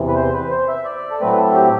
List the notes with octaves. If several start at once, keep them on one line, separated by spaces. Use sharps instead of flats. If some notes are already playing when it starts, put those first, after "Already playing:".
Already playing: E2 C3 E3
B4
C5
B4
C5
E5
D5
A4
A2 F#3 A3 C4 B4
A4
G4